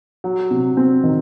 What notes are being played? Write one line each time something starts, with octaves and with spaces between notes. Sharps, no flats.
F#3
C3
C4
D#3